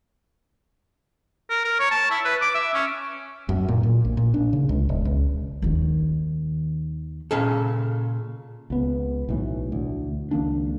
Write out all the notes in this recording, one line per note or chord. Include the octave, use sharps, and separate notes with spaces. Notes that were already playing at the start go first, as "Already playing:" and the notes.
A#4
A#4
C#5
A5
E4
B4
D6
E5
C#4
F#2
A#2
A#2
A#1
A#2
D4
C#3
C#2
E1
C#2
D#2 D#3
A#2 C#3 A4
C#2 B3
B1 A2 E3
D2
C#2 D#3 A#3 D4